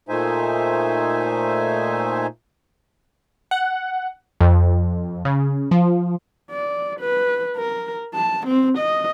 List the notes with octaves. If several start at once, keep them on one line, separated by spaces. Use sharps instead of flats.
A#2 A3 D#4 C5 E5 G#5
F#5
F2
C#3
F3
D5
B4
A#4
A5
C4
D#5